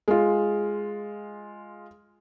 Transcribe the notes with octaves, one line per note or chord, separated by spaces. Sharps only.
G#3 F4